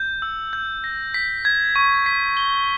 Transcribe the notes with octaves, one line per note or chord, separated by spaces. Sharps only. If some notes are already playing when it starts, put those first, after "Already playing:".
Already playing: G6
E6
G6
A#6
B6
G#6
C#6
B6
G7